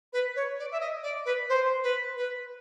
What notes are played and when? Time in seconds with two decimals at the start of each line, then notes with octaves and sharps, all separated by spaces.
0.12 B4
0.35 C#5
0.58 D5
0.71 E5
0.80 D#5
1.03 D5
1.25 B4
1.49 C5
1.83 B4
2.16 B4